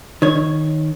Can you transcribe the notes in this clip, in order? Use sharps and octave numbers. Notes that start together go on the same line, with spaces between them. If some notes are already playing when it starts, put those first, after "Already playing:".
D#3 C#5